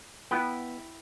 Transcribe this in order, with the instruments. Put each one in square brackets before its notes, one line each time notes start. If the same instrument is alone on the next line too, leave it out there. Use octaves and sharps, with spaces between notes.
[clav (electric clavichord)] B3 [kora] E4 B4 G5